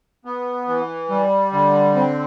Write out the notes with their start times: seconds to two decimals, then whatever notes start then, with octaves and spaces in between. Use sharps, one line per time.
0.25 B3
0.68 E3
1.09 G3
1.52 D3
1.95 C4